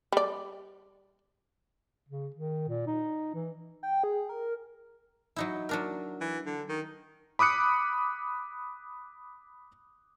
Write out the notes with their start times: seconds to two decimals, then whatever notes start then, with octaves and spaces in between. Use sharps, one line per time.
0.12 G3 D5
2.08 C#3
2.36 D#3
2.68 A#2
2.87 D#4
3.34 E3
3.83 G5
4.04 G#4
4.29 A#4
5.36 F#3 D#4 E4
5.69 F#3 D4 A#4
6.21 E3
6.46 D3
6.69 D#3
7.39 B5 D6 D#6 F#6 C#7